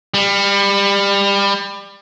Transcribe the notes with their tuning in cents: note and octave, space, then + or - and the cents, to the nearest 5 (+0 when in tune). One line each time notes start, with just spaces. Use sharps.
G3 +25